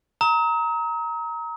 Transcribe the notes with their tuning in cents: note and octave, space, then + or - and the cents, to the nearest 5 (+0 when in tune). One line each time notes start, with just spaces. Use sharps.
A#5 +0 D#6 +45